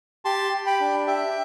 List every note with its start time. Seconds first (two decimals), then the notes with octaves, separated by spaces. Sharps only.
0.25 G4 A5 C6
0.53 G4
0.66 G5 B5
0.80 D4
1.07 G4 E5 G5